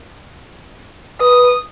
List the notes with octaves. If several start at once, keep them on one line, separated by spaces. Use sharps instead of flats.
B4 D#6